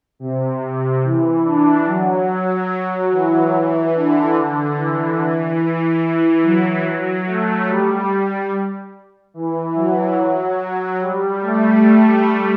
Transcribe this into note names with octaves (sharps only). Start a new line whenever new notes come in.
C3
E3
D4
F#3
E3
E3
D3
E3
E3
E3
F#3
A3
G3
G3
E3
F#3
F#3
F#3
G3
A3